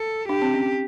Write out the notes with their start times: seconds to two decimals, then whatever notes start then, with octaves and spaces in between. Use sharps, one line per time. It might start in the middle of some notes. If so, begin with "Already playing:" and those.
Already playing: A4
0.28 D4 G4
0.42 C4
0.54 C#4